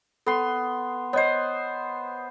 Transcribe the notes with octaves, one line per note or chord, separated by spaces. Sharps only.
B3 A4 C6
B3 C5 C#5 D#5